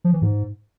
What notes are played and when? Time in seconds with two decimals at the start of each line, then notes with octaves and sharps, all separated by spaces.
0.04 F3
0.13 E3
0.22 G#2